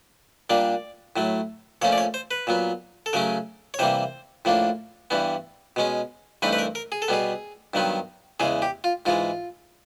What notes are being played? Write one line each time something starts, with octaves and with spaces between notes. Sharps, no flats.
A#2 G3 A#3 D4 D5
A2 F#3 A3
A#2 F3 A3 C#4 C#5
D5
C#5
C5
B4
A#2 F#3 B3
A4
C#3 F#3 A3 C#4 A#4
C#5
C3 E3 G3 A#3 C5
A2 F3 A#3 D4
G2 E3 G3 B3
B2 G#3 C#4
G2 E3 A3 C4 D#4 B4
B4
A#4
A#4
G#4
A4
B2 G3 B3 G#4
G2 D#3 F#3 B3 D#4
E2 C#3 E3 G#3 G#4
G4
F4
G#2 E3 G#3 F4